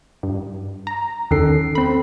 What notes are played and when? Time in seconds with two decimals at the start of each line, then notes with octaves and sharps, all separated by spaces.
0.23 G2
0.87 A#5
1.31 E2 D#3 C#4 A4 C7
1.75 C4 B5